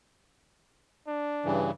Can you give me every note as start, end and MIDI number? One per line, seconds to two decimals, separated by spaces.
1.07 1.65 62
1.45 1.71 43
1.45 1.71 49
1.45 1.71 52